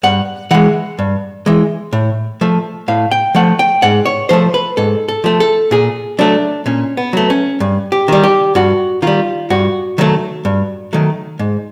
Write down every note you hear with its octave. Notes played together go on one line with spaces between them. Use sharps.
G2 F#5
E3 G#3 F#5
G2
E3 G#3
A2
F3 A3
A2 F5
G5
F3 A3 F#5
G5
G#2 F#5
C#5
F3 A3 C5
B4
G#2 A4
A4
F3 A3
A4
A#2 G#4
F#3 A3 D4
A#2 C#4
B3
F#3 A3
C#4
G2
G4
D#3 G3
G4
G2 F#4
D#3 G3 F4
G2 F#4
D#3 F#3 A3
G2
D#3 F#3 A3
G#2